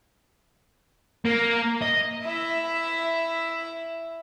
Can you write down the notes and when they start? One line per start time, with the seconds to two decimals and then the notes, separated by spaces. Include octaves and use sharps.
1.25 A#3
1.82 D#5
2.23 E4 E5